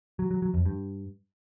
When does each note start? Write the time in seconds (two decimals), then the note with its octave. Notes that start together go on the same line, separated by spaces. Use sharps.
0.19 F#3
0.31 F#3
0.42 F#3
0.54 F2
0.65 G2